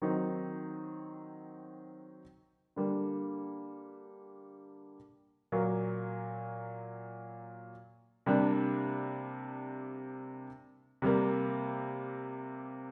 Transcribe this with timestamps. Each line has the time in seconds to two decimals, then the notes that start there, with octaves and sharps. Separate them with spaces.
0.02 D#3 F#3 C4 D#4
2.76 D3 G3 A#3
5.52 A#2 F#3 A#3
8.26 C3 G3 A#3 D4
11.02 C3 G3 A#3